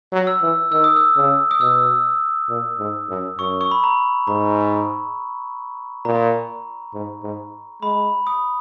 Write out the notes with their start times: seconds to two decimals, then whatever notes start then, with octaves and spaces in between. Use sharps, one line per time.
0.12 F#3
0.27 E6
0.42 E3
0.72 D#3 E6
0.84 D#6
0.96 E6
1.16 C#3
1.51 D#6
1.60 B2 E6
2.49 A#2
2.79 G#2
3.09 F#2
3.38 F#2 C#6
3.61 C#6
3.71 B5
3.84 A#5
4.27 G#2 A#5
6.05 A#2 A#5
6.94 G#2
7.23 G#2
7.82 G#3 B5
8.27 D#6